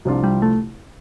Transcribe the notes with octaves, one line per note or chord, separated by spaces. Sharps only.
C2 C3 F3 D4 F4
G3
A3